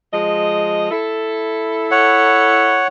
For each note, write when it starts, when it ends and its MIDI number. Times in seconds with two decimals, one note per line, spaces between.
0.13 0.91 53
0.13 0.91 56
0.13 0.91 75
0.91 2.86 64
0.91 2.86 69
1.91 2.87 73
1.91 2.87 78